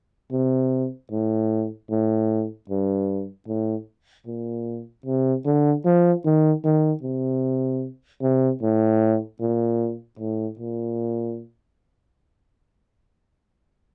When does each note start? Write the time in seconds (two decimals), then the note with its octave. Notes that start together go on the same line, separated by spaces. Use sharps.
0.32 C3
1.11 A2
1.90 A2
2.70 G2
3.48 A2
4.27 A#2
5.06 C3
5.46 D3
5.85 F3
6.25 D#3
6.65 D#3
7.03 C3
8.22 C3
8.62 A2
9.40 A#2
10.19 A2
10.59 A#2